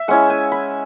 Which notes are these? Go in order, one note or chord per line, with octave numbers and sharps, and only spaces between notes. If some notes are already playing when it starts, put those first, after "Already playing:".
Already playing: E5
G#3 C#4 E4 F#5
G#5
B5